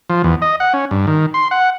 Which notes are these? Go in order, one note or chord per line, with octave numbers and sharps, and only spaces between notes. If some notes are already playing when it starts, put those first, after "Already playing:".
F3
E2
D#5
F#5
C#4
G2
D#3
C6
F#5